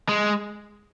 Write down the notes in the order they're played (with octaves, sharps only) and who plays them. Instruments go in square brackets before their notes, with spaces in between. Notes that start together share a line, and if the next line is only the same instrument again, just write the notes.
[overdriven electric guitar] G#3